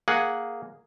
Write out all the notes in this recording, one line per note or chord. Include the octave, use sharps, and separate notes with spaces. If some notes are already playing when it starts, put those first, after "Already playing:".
A#3 G#4 F#5